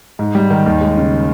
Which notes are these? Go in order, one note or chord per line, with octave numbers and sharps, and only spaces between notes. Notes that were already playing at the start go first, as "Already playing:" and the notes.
G#2
G3
D#3
D#2
G#3
C#3